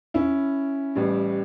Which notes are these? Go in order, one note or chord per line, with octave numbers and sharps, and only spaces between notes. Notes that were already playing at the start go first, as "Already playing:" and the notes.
C#4 E4
A1 A2 G3